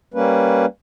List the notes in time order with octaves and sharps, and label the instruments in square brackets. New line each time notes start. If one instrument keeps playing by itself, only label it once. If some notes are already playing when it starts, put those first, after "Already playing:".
[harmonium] G3 A#3 C#4 B4